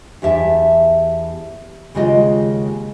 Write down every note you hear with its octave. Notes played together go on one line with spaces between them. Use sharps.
E2 G4 E5 A5
D#2 C#3 G#3 F4 G4 D#5